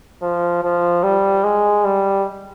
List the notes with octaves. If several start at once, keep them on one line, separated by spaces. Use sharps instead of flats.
F3
F3
G3
G#3
G3